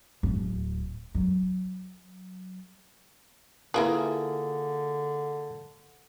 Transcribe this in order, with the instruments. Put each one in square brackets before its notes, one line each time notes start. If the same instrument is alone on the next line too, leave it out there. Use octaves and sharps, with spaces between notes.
[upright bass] D1
F#3
[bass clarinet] D3 [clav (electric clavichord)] A#3 F4 G#4 [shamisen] E4 A#4 B4